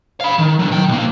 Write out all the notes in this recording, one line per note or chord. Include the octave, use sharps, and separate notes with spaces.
F5 B5
D#3
D3 F#3
D#3 G5
B1 A#3